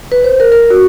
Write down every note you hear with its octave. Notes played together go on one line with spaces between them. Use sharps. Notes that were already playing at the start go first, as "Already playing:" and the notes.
B4
C5
A#4
A#4
F#4